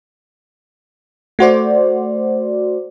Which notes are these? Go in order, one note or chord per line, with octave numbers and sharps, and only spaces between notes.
A3 F#4 C5 D5